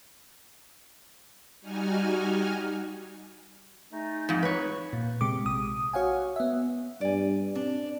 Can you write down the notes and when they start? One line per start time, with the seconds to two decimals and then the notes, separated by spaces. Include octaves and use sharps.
1.61 G3 D#4 F#4 G#5 F6
3.92 G#3 A3 D#4
4.29 F2 G#2
4.43 B4 C#5
4.93 A#2
5.21 C3 G#3 D6
5.44 A#1 D#6
5.93 F#4 C#5 F5 F#5 G#5
6.36 B3 E5
7.01 G2 D5 G#5
7.55 C4 D4